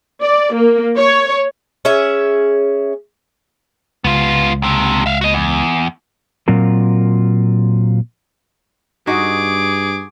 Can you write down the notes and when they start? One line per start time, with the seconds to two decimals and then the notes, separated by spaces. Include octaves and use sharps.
0.21 D5
0.53 A#3
0.98 C#5
1.85 C#4 G#4 E5
4.04 C#2 B3 F4
4.62 D#2 C3
5.06 E5 F5
5.21 F#4 D#5
5.34 E2
6.48 A#2 F#3 C4 F4 A#4
9.07 G2 D#4 F#4 G#4 D6